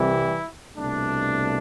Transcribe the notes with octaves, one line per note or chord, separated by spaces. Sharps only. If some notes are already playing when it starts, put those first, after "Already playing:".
Already playing: C2 C3 E3 G3 E4
C2 B2 A3 D4